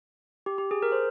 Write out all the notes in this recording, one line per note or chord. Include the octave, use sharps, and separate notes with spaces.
G4
G4
G#4
A#4
C5